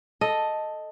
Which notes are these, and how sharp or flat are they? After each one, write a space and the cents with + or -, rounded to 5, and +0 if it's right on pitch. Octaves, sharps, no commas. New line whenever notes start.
A4 +0 D#5 +0